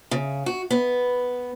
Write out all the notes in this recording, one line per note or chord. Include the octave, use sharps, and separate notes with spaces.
C#3
F#4
B3